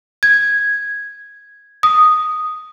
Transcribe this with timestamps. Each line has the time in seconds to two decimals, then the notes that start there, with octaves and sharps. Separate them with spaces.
0.23 G#6
1.83 D#6